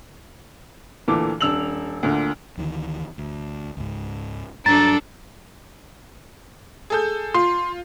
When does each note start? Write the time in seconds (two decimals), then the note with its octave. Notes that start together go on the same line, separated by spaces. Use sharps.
1.08 D2 A#2 E3 A4 D6
1.41 D#1 D4 E6 F7 F#7
2.03 D2 A#2 D3
2.58 D2 D#3 E3
3.18 D2
3.77 C#2 G#2
4.66 G2 F#3 D4 A4 A#5 A6
6.90 G#4 A4 G6
7.34 F4 C6